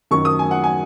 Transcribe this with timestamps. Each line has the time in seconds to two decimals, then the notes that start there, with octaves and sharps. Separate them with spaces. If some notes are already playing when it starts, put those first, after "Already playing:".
0.11 F#2 D#3 F#3 C#6
0.25 D#6
0.39 G#5
0.51 F#5
0.64 G#5